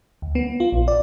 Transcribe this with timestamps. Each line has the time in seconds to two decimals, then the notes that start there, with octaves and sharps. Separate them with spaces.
0.22 D2
0.35 B3
0.60 F4
0.72 A#1
0.88 D5